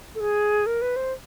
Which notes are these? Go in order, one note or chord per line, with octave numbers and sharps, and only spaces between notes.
A4
G#4
A#4
B4
C5